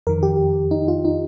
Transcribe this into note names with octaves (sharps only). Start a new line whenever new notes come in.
F2 D#3 A#4
G4
D#4
F4
D#4